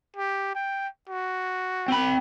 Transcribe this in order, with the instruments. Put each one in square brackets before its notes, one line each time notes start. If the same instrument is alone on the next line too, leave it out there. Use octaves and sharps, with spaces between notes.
[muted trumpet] G4
G5
F#4
[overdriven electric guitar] C4 B5